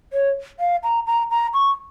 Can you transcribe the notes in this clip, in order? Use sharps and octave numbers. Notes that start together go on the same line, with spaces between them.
C#5
F5
A#5
A#5
A#5
C#6